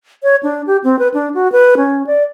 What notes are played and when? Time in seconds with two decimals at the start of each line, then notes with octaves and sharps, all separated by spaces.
0.23 C#5
0.43 D4
0.67 G4
0.84 C4
0.99 B4
1.14 D4
1.34 F#4
1.52 B4
1.77 C#4
2.07 D5